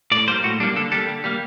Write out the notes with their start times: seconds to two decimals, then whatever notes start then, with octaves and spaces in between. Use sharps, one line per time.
0.12 A2 D5
0.28 G3 A#3 C5
0.44 A2 F#4
0.60 G3 D4
0.63 A#3
0.76 D3 A4
0.92 G3 A#3 A4
1.08 D3
1.24 G3 A#3